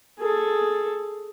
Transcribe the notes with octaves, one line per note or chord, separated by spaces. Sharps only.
G#4 A4